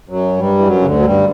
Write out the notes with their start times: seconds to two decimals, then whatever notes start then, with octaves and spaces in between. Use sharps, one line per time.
0.09 F#2 F#3
0.38 G2 G3
0.58 E3
0.66 F#2 F#3
0.81 C#3
0.86 D2 D3
0.99 F#3
1.05 G2 G3